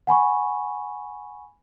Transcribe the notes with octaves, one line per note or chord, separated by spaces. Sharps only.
F#5 G#5 B5 C#6